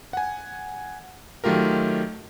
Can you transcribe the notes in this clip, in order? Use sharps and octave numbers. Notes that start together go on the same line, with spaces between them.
F#5 G#5
D#3 F#3 A3 F4 G4 A#4